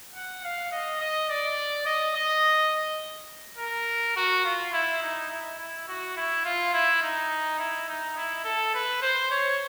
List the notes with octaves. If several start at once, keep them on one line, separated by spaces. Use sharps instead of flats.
F#5
F5
D#5
D#5
D5
D#5
D#5
A#4
F#4
F4
E4
D#4
E4
E4
F#4
E4
F4
E4
D#4
E4
D#4
E4
A4
B4
C5
C#5